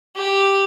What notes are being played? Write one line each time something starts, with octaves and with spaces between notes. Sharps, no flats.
G4